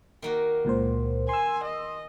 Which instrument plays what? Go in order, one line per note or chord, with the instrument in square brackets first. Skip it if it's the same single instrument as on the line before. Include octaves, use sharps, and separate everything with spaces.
[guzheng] D#3 A#3 F#4
[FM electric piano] C#2 A#2 C5
[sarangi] G#5 [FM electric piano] C6 E6
[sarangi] D#5